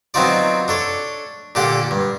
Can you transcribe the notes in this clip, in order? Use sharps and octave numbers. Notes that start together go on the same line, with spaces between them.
F#3 B3 C4 D#4 F4 D5
D4 A4 C#5
A#2 D3 G4 A4 F#5
G2